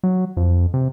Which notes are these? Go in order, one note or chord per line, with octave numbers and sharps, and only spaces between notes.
F#3
F2
C3